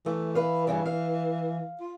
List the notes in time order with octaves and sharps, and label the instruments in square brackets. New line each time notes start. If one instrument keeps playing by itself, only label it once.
[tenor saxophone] E3 [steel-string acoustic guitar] A3
[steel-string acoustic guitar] B4 F5
G2 C#3 G3
F5
[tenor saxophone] F4